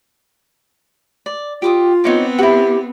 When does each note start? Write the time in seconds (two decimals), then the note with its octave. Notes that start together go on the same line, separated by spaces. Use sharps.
1.26 D5
1.62 F4 G4 D6 D#6
2.04 B3 C4 D#4 C#5 D6
2.39 E4 F#4 G4